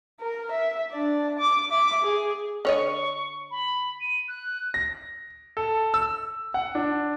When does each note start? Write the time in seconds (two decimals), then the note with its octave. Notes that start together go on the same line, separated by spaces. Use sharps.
0.20 A#4
0.52 E5
0.91 D4 D5
1.39 D6
1.70 E5 D6
2.02 G#4
2.65 D3 C#5 D#5 C#6
3.51 B5
4.01 D#7
4.28 F#6
4.74 A#6
5.57 A4
5.94 E6
6.54 F#5
6.75 D4